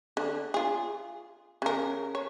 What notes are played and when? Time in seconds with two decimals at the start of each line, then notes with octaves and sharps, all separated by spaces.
0.17 D3
0.54 F4 G#4
1.62 C#3 A#4
2.15 C#5